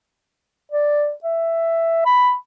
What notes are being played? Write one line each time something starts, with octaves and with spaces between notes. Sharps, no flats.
D5
E5
B5